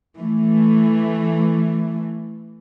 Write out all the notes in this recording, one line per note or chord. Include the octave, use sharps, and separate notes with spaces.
E3 A3